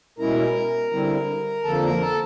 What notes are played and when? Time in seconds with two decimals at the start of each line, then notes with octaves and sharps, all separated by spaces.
0.19 B2 G#3 C#4 E4 A#4 A#5
0.92 D3 G3 C4 E4
1.64 F2 D3 F3 A#3 A4 A5
1.82 A#4 A#5
2.01 A4 A5